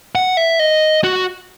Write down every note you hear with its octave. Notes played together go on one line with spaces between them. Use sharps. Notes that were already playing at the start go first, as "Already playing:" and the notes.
F#5
E5
D#5
F#4